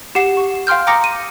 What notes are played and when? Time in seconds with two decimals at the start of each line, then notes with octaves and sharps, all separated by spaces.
0.15 G4 F#5 C7 E7
0.37 C#6
0.67 F5 G5 C6 F6 G6
0.87 G5 A#5 D6 D#6 A#6 C#7
1.04 D#7